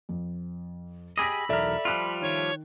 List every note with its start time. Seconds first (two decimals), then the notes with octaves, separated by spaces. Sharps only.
0.09 F2
1.18 G4 G#4 D#5 B5 D6 E6 A#6
1.49 B1 E2 A4 A#4 D5 E5
1.85 F3 G3 F4 C6 E6 F#6
2.22 D#3 C#5